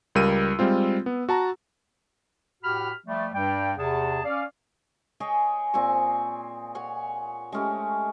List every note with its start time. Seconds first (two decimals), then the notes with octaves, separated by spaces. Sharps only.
0.15 C#2 G3 A#4 E6 D#7
0.59 G3 G#3 C4 F4
1.06 B3
1.29 F#4 A5 A#5
2.63 A2 F#4 G4 B5 F6
3.07 F3 G3 A3
3.33 G2 G3 G5
3.77 E2 C3 G#4 A5
4.25 C#4 D5 F5
5.20 G#4 C#5 D#5 G5
5.74 A#2 C4 G#5 C#6
6.75 C#5 F#5 G#5
7.52 G#3 A3 C#4 G4